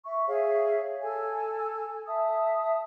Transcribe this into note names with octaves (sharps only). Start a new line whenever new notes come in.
E5 C#6
G#4 C#5 E5 F5
A4 G#5
E5 A5 D#6